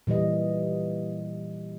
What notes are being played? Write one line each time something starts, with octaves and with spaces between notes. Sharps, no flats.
A#2 E3 G3 D#5